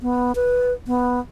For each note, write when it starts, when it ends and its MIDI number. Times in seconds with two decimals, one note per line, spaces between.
0.02 0.32 59
0.36 0.73 71
0.87 1.19 59